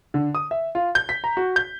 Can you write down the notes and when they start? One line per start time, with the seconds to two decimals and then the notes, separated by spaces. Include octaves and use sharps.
0.14 D3
0.35 D#6
0.51 E5
0.75 F4
0.95 G6
1.09 B6
1.24 A#5
1.37 F#4
1.56 G6